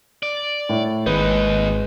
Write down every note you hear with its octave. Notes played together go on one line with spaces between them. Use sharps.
D5
A2
G#1 D#2 G#3 D#4 B4